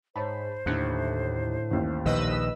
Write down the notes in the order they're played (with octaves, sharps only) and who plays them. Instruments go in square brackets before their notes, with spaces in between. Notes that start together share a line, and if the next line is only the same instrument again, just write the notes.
[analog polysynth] G#2 [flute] C5 [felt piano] C#5 A5 B5
[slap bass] D#2 [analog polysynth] A2 [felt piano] D3 F#6 C#7
[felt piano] A1 D#2
[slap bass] A#1 D#3 [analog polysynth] B4 D#5 E6